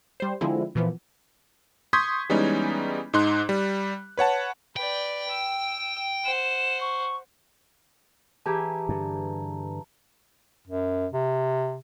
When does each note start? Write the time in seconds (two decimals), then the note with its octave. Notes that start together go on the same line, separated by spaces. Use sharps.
0.20 G3 C5
0.41 D3 F3 G#3 C4 E4
0.75 A#2 E3 F3 B3
1.93 C6 C#6 D#6 G6 G#6 B6
2.29 E3 G3 G#3 B3 C#4 D#4
3.13 G#2 D#4 C6 F#6
3.49 G3
4.17 B4 C#5 F#5 A5
4.76 B4 D5 G5
5.31 E6
6.25 C5 F#5 E7
6.81 C#6
8.46 E3 G4 G#4 A5 A#5
8.89 G2 D3
10.68 F#2
11.13 C3